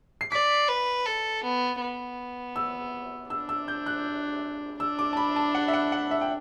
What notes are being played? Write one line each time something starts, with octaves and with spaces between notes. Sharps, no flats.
C7
D5 B6
B4
A4
B3
B3
E6
D4 E6
E6
G6
F#6
D4 E6
D6
A5
B5
A5
F#5
E5
F#5
F#5
E5
G5